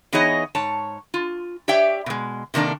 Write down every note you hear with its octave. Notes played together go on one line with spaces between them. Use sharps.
E3 B3 D#4 G#4 C#5 D#5
G#2 C#5 A5
F4
G4 C#5 D5 E5 G5
B2 G#3
C3 D#3 A#3 D4 A4